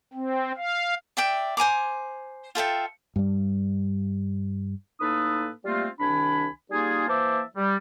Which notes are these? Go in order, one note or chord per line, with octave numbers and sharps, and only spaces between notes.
C4
F5
D5 E5 G5
C5 G#5 A#5 D6
F4 A4 E5 G5
G2 G3
A2 A#3 D#4 A4 B4 D#6
G3 A3 A#3 C4 F4
C2 D#3 D4 G#5 B5
G3 A#3 D#4 F4 G#4
E3 A#3 C5 E5 A5 D6
G3